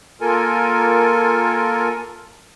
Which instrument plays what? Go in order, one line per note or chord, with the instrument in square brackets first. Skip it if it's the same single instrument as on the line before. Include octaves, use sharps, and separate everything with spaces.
[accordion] A#3 F4 A4 A#4 G#5